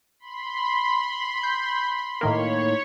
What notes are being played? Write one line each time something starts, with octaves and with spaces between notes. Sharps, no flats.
B5 C6
G6
A2 D#3 A#3 C#5